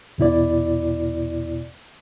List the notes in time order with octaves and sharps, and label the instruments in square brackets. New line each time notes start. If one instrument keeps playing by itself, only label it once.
[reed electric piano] E2 B2 E4 D5